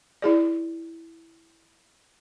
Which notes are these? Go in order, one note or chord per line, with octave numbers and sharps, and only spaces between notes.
E4 G#4 D5